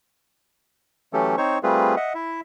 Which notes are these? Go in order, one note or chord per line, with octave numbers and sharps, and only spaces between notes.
E3 F#3 A3 C#4 G4 A4
C4 D#4 C5 C#5 C#6
G3 A3 C4 F4 G#4 B4
D#5 E5 F#5
E4 E5